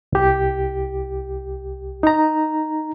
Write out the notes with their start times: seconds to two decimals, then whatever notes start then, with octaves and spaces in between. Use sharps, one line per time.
0.13 C2 G4
2.03 D#4 A#5